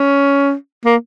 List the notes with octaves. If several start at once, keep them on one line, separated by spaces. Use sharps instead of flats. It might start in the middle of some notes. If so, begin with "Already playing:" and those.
Already playing: C#4
A#3